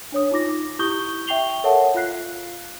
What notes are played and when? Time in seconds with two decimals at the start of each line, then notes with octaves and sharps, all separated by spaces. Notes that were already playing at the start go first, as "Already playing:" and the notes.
0.12 D4 C#5 D#6
0.31 D#4 F4 D6 A#6
0.79 E4 G4 C#6 D#6 G6 G7
1.27 E5 G5 C#6 C7 F7 G7
1.64 A4 A#4 C#5 E5 F#5 A5
1.95 F4 F5 F#6 C7